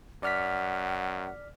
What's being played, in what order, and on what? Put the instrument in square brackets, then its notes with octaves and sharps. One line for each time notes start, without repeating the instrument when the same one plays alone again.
[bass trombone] F#2 [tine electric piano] D5 F6 B6 [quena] F#5